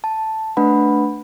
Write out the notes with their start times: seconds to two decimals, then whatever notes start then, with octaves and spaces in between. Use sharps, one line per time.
0.04 A5
0.57 A3 D4 B4 F#5 B5